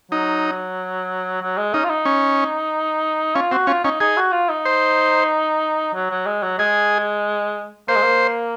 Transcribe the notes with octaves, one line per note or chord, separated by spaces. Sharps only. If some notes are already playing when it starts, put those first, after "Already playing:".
F#3 D#4
F#3
G#3
C#4 D#4
F4
D#4
C#4
C#4 F4
C4 F#4
C#4 F4
C#4 D#4
D#4 G#4
F#4
F4
D#4
C5
F#3
F#3
G#3
F#3
G#3 G#4
A#3 C5
G#3
A#3